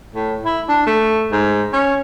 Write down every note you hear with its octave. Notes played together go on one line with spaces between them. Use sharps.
A2
E4
D4
A3
G#2
C#4